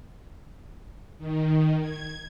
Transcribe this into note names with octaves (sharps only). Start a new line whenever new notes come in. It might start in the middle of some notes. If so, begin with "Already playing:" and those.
D#3
G#6